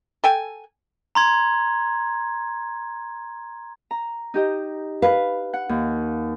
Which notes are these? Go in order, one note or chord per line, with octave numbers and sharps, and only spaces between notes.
A4 G5 G#5
A#5 C6 G#6
A#5
D#4 G4 D#5
B4 F5
F#5
D#2